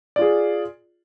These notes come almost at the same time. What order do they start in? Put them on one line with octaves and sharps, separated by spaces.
D5 F4 G#4